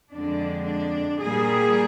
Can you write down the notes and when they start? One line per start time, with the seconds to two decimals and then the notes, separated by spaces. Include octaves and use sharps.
0.13 F2 D3 G#3 D4
0.67 D4
1.22 A#2 G3 A#3 G#4